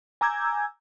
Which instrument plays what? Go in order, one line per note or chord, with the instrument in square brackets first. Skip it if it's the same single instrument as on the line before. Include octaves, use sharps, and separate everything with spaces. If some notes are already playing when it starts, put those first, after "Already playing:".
[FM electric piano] G#5 A#5 D6 E6 G6 G#6